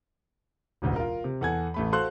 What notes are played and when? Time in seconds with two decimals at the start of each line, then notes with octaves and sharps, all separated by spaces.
0.82 E1 A1 D2
0.96 F4 A#4
1.24 C3
1.41 E2 A4 F#5 G#5 G#6
1.74 A1 A3 B5
1.92 F#4 A4 C5 F5 C6 F#6